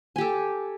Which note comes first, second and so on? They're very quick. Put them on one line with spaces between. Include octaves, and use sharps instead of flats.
G#5 G4 A4